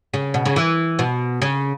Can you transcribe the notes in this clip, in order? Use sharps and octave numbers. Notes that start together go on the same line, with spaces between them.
C#3
B2
C#3
E3
B2
C#3